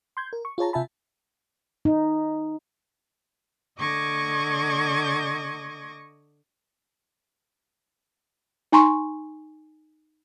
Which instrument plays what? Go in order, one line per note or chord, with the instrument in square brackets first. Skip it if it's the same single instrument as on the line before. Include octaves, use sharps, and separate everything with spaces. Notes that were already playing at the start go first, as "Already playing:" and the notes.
[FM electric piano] C6 G6 G#6
A#4
C#6
F4 G#4 C#5 A5 A#5
C3 F4 E5 G#5 A5 B5
[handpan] D#4
[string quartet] D3 D#5 C#6 D6 G#6 A#6
[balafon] D#4 G#5 A#5 C6 C#6